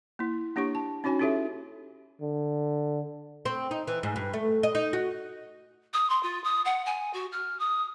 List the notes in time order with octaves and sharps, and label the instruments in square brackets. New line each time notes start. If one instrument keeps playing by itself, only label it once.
[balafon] A#3 E4
A#3 D4 G4 C#5 C#6
A5
C#4 D#4 F#4 C#5 G#5
C#4 E4 G4 A4 C#5 E5
[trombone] D3
[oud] C4
D#4
E3
G#2
G2
A3
D#5
D#4
F#4
[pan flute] D#6
C6
F4
D#6
F#5
G#5
F#4
F6
D#6